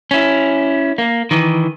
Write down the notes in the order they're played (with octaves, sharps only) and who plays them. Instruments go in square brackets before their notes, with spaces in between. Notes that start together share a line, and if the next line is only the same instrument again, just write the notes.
[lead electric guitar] C#4 E4
A#3
D#3 E3